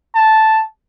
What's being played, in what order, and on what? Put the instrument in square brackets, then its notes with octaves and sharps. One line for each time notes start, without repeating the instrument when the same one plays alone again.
[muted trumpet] A5